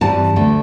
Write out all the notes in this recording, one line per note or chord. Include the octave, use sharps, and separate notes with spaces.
G2 E3 G3 C4 A5
D2 D3 A3